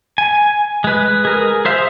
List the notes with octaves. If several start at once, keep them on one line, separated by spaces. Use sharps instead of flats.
G#5
G#3 B4
G#4 A#4
G#4 C5 E5 F5